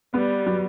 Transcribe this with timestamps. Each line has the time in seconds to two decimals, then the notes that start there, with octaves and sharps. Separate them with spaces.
0.14 G3 B3
0.46 F#3